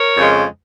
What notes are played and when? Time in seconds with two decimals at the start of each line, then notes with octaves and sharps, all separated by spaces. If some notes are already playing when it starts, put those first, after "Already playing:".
Already playing: A#4 C#5
0.17 F2 C#3 G#3